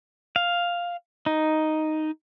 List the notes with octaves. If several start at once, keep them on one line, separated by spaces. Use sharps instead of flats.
F5
D#4